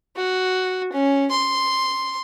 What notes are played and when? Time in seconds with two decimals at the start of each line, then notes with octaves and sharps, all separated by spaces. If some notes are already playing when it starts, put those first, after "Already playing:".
0.16 F#4
0.92 C#4
1.31 C6